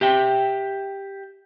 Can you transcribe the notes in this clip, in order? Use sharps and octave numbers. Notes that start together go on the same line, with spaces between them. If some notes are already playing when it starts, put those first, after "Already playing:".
G4 E5 G5